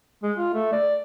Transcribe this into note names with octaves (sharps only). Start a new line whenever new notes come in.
G#3
F4
A3
D5